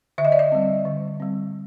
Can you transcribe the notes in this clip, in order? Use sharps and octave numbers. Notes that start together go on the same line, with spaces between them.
D3 E5
D#5
D5
D#5
G3 C4
D3
G3 C4